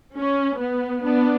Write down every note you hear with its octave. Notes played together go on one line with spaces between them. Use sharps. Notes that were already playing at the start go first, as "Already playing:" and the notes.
C#4
B3
B3 D4